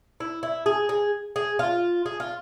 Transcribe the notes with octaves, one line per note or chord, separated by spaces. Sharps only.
E4
E4
G#4
G#4
G#4
F4
G#4
F4